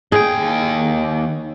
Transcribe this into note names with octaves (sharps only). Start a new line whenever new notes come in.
D#2 G#4 G5